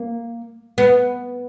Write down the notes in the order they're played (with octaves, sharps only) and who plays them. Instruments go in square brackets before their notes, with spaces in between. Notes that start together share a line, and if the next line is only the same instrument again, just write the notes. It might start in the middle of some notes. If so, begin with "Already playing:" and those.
Already playing: [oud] A#3
B3